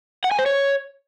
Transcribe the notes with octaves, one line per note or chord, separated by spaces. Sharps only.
F#5
G#5
C5
C#5